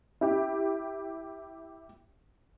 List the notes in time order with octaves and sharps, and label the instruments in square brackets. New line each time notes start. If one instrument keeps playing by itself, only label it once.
[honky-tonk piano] E4 G4